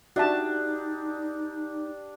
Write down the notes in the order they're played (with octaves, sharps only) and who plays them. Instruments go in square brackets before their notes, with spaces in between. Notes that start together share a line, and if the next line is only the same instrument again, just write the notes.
[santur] D4 G4 [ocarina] D#4 [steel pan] F#4 E5 A5